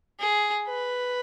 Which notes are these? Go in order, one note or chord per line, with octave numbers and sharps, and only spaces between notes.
G#4
B4